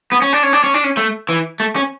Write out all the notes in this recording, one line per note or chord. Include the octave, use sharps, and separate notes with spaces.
B3
C#4
D4
C#4
D4
C#4
D4
C#4
A3
E3
A3
C#4